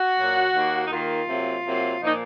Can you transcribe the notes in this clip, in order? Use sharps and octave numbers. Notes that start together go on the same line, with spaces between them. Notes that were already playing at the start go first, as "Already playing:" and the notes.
Already playing: F#4
A#2 F#3 A#3
D#2 D#3 A#3
D#4
D#2 D#3 A#3 F4
C3 F#3 A#3
C3 F#3 A#3
A#2 F3 A#3 D#4